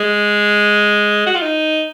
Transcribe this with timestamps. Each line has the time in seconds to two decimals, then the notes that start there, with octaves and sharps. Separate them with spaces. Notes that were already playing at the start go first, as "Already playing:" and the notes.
Already playing: G#3
1.26 F#4
1.35 F4
1.42 D#4